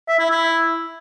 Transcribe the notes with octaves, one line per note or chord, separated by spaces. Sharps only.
E5
E4
E4